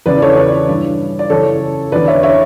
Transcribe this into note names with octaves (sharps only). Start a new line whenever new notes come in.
E2 C#3 E3 B4 D5
A4 C#5
B4 D5
G2 E3
D5
F#2 C#3 E3 A4 C#5
E2 D3 B4 D5
C#5 E5
C#5 E5